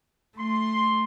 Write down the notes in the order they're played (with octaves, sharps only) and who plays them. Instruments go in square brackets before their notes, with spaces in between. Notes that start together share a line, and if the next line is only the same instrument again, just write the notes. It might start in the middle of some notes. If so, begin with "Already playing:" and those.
[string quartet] A3 [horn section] C6